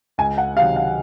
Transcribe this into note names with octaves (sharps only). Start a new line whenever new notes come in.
C#2 G#5
F#5
C3 D#3 F#3 F5
F5